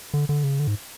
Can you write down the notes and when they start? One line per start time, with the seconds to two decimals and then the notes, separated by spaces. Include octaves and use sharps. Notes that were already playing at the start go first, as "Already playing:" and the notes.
0.14 D3
0.29 D3
0.44 C#3
0.60 D3
0.67 G#2